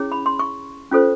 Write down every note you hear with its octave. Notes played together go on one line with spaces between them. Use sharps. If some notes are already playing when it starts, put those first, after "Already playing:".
Already playing: C#4 E4 G#4 C#5
B5
C6
C#6
C#4 F4 A4 C5